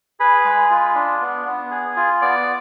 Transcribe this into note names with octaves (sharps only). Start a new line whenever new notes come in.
G#4 B4 B5
G#3
F4
D4
B3
B3
G#4
F4
B3 D5 D6